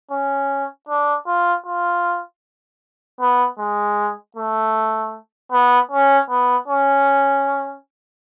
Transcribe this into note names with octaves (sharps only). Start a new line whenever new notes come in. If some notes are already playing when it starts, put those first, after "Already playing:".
C#4
D4
F4
F4
B3
G#3
A3
B3
C#4
B3
C#4